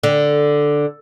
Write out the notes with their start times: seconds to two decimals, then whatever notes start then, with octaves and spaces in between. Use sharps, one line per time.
0.03 D3